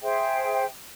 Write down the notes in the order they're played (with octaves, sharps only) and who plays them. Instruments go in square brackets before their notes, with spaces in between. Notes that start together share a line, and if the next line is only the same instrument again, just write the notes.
[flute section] G#4 C5 E5 G5